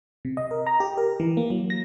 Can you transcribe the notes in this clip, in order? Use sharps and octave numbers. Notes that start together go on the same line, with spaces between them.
C3
D#5
A#4
A#5
G4
A#4
E3
A#3
F#3
A#6